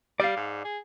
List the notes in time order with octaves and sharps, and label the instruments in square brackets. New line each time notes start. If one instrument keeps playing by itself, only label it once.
[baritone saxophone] G3 [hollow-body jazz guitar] D5 F5
[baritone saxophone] G#2
G#4